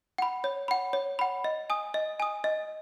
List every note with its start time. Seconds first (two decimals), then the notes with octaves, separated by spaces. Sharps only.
0.18 F#5 B5
0.44 C#5
0.68 F#5 B5
0.93 C#5
1.19 F#5 B5
1.44 D#5
1.70 G#5 D#6
1.94 D#5
2.20 G#5 D#6
2.44 D#5